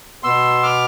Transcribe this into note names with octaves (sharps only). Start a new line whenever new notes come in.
B2 B3 C6 E6
D6 F6